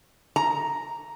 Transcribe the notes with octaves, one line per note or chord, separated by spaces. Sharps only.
A#5